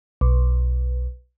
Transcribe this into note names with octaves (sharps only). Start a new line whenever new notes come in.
B1